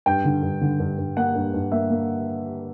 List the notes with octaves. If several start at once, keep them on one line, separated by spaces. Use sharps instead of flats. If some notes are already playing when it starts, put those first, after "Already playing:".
G2 G5
D3
G2
D3
G2
G2
A#3 F#5
G2
G2
A#3 E5
A#3